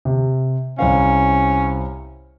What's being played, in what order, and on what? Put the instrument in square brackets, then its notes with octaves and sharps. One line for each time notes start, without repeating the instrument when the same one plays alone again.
[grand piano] C3
[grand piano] C2 C5 F5 [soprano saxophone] C#4